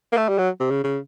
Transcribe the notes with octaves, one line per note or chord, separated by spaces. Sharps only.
A#3
A3
G3
F#3
C3
C#3
C#3